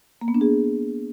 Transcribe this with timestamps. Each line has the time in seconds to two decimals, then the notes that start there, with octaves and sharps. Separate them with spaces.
0.21 A#3
0.28 B3
0.35 D4
0.41 G#4